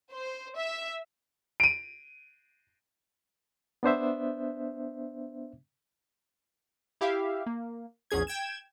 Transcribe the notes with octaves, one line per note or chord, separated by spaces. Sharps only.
C5
E5
D7 D#7
B3 D4 C5 E5
E4 G4 E5 F5
A#3
A#1 E2 C#4 G#4 G#6
G5 G#6 E7